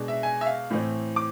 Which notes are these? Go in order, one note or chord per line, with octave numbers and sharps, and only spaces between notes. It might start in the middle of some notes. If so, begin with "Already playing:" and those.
Already playing: B2 G#3 D4
E5
G#5
E5
F5
A2 E3 A3 C4
D6